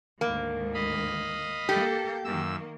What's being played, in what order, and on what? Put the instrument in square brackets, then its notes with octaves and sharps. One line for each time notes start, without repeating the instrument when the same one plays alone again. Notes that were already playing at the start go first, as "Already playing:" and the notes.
[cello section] D2 G#2 D#3 [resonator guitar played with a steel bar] A#3
[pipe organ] D#5 F5 B5
[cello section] A#3 A4 [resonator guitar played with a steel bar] G4
[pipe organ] F#2 E6 [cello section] D#3 A#3